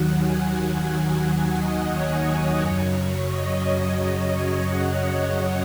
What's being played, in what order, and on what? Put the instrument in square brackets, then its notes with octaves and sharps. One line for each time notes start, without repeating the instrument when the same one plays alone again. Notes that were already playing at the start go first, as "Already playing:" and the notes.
Already playing: [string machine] D#2 D#3 F#3 F#5
G#5
G#5
F#5
F#5
D#5
C#5
F#2 C#3 F#3
D#5
F#5